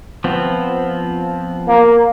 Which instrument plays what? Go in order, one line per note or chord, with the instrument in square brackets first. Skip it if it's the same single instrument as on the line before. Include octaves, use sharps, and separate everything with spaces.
[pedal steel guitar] F3 B3 C4
[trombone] A#3